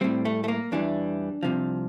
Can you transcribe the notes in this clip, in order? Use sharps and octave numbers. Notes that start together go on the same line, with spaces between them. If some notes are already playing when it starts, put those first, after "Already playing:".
A2 G3 C4
A3
A3
A#3
E2 E3 G3 D4
C2 C3 F3